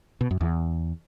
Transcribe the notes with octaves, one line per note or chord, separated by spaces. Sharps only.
B2
F#2
E2